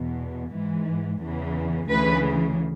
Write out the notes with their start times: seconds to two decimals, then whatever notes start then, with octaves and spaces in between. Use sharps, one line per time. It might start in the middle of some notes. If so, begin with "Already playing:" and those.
Already playing: E2 B2
0.53 G#2 E3
1.21 E2 C#3 E3
1.88 D2 C#3 E3 B4